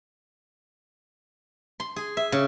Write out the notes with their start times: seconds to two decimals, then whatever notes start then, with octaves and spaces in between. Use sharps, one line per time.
1.80 C6
1.96 G#4
2.17 E5
2.32 C#3